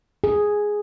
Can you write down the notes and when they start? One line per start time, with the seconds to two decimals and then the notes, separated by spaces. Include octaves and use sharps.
0.24 G#4